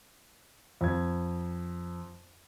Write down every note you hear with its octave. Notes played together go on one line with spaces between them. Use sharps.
F2 G#6